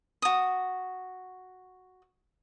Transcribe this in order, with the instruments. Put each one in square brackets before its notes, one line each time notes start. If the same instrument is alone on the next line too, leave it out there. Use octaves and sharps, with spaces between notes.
[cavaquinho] F#4 D#6